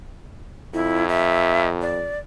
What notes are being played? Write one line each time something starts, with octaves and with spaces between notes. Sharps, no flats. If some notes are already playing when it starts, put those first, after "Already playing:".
F2 E4
E5
D5